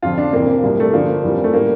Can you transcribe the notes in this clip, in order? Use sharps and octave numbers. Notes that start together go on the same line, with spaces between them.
F2 D3 F3 F4
D4
F2 C3 E3 A#3
C2 A#2 G3
A3
G2 D3 F3 A#3
F2 E3 G3
A3
A2 G3 A#3